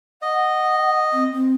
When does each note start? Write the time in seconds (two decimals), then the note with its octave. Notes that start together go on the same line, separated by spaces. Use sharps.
0.22 D#5 F#5
1.12 C4
1.32 C4